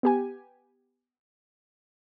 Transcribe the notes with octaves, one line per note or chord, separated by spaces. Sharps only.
B3 G4 G#5